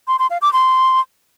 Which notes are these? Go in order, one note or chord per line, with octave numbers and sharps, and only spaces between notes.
C6
C6
F5
D6
C6